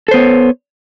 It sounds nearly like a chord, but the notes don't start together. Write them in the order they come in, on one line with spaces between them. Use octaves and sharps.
A4 C5 B3 C#5